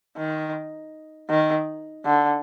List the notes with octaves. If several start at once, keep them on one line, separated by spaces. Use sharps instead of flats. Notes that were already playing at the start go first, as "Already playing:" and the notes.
D#3
D#3
D3